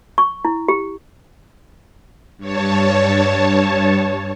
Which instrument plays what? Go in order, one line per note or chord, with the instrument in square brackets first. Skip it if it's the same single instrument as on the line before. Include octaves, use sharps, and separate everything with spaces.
[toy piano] C#6
E4
G4
[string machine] G2 C#5 A5